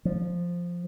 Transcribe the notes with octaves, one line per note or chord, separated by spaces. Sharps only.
F3